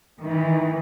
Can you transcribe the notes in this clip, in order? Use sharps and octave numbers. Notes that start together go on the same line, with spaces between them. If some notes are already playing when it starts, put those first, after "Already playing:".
D#3 E3